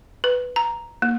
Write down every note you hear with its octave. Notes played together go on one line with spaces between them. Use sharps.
B4
A#5
A#3